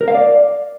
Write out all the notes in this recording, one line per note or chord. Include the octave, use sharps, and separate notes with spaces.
A#4
F5
D5